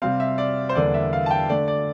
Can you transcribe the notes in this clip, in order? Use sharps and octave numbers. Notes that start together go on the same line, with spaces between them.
C3 G3 C4 F5
E5
D5
C5
E2 D3 G3 A#3 D4 D5
E5
F5
A5
G5
D3 A3 D4 D5
D5